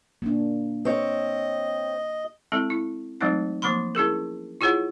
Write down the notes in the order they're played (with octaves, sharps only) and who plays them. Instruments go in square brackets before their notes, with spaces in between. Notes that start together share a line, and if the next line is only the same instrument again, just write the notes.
[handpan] A#3 D4
[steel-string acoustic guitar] C4 C#5 [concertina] D#5
[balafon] G#3 C4 E4 A4
E4
E3 F#3 G#3 A3 C4 D#4
E3 F3 A#3 B5 C6
C#4 E4 G#4 A#4
E4 F4 G#4 C#5 F#5